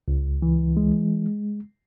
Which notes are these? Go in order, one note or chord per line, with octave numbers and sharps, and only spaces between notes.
C#2
E3
G#3